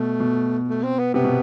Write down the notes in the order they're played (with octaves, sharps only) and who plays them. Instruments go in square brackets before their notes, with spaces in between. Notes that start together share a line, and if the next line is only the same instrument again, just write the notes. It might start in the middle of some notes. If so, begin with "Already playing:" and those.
Already playing: [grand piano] B2 [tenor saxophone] A3
[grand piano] B2
[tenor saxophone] A3
C4
B3
[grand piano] C3 [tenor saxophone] B3
[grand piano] B2